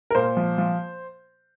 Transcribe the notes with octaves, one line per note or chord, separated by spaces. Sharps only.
A#4
A#2 C5
F3
F3